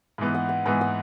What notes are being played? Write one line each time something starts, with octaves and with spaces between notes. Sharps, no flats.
G#2 E3 B3
F#5
F#5
G#2 E3 B3 G#5
F#5